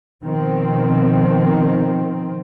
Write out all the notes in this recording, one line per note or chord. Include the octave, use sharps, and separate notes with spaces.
B2 D#3 F3 C4